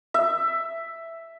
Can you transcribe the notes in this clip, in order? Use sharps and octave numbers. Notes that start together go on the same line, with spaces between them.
E5